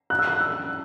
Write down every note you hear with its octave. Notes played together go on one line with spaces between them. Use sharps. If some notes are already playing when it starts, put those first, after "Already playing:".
F#6
E6
F#6
E6